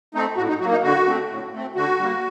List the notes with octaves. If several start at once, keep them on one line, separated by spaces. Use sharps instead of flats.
A3 C4 D#4
A2 F#4
D#4
F#3 A#3 F#4
D#4
D3 F#4
A3 C4
A2
A3 C4
D3 F#4
G3 A#3